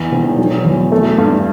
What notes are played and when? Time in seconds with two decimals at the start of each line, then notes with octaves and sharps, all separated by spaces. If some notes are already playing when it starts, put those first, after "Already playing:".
Already playing: E2
0.12 E1
0.39 F#3
0.64 E2
0.92 A3
1.18 G2